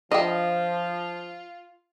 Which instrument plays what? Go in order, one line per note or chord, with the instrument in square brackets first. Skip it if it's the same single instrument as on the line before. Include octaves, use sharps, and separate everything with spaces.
[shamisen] D3 E4 G5 [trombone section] F3 [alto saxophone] F4 [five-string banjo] D#5